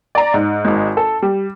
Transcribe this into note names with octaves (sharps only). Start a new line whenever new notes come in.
D5 A#5
G#2
G#1 G#3
A4
G3